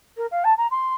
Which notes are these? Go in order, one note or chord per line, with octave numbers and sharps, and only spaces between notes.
A#4
F5
A5
A#5
C6